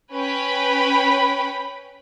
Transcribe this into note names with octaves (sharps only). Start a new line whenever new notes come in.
C#4 B4 G5 B5